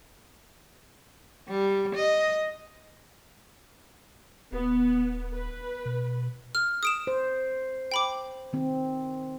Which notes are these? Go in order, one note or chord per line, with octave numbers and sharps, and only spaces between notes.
G3
D#5
D#1 B3
B4
B2
F6
D#6 D7 E7
C5
G5 B5 D6
D#3 C4